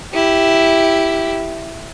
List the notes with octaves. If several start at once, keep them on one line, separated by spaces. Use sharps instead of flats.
E4 G4